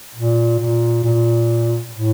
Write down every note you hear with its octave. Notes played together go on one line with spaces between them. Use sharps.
A#2
A#2
A#2
A2